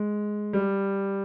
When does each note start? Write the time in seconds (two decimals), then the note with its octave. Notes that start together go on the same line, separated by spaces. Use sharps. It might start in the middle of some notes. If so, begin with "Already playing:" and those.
Already playing: G#3
0.53 G3